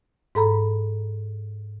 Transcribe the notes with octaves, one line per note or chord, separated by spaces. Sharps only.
G#2 A4 A#5 B5